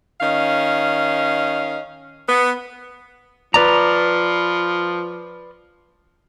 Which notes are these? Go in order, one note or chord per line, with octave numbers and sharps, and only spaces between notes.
D#3 C#4 D#5 F5
B3
F3 B4 D5 A#5